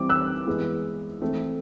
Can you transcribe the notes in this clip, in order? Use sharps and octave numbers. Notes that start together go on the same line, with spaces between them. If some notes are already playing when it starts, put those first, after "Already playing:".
Already playing: E3 G3 C4 D6
E6 F#6
E3 G#3 B3
E3 A3 C4